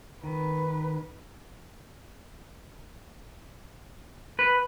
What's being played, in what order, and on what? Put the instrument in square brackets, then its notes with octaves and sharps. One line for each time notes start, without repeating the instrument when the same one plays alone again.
[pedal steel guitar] D#3 [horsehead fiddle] B4
[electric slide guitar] B4